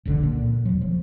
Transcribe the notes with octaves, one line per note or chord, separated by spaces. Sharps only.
F1 C#2 D3
A#2
E1 F#3
F3